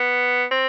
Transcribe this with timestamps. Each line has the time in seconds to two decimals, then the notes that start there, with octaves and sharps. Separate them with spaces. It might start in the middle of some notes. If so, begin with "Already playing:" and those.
Already playing: B3
0.51 C4